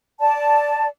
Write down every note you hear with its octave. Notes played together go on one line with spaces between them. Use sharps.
D5 A5